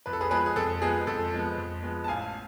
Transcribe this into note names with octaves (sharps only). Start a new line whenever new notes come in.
F2 B4
A4
G#4 B4
F3 G#3 B3 G#4 B4
G#4
F2 A4
F3 G#3 B3 G#4
F2 A4
F3 G#3 B3
F2
F3 G#3 B3
A5
A1 F5 G#5